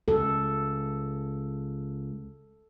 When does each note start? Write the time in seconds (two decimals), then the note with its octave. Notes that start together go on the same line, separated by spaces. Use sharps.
0.08 C#2 A4